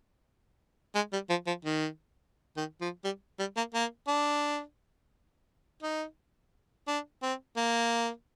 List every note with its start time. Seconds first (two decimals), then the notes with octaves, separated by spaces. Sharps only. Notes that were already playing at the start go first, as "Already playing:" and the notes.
0.95 G#3
1.13 G3
1.30 F3
1.47 F3
1.65 D#3
2.57 D#3
2.81 F3
3.04 G3
3.39 G3
3.57 A#3
3.74 A#3
4.08 D4
5.82 D#4
6.87 D4
7.22 C4
7.57 A#3